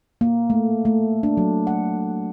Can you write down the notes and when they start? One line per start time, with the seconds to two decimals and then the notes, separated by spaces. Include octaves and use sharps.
0.21 A#3
0.50 A3
0.85 A3
1.23 D4
1.37 F#3
1.67 F#5